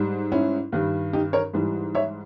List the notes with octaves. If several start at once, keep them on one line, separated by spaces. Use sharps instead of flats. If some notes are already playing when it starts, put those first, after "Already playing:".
Already playing: G#2 G3
C#4 E4
G2 D#3 G3
D#4 G4
A#4 C#5
G#2 E3 G3
C#5 E5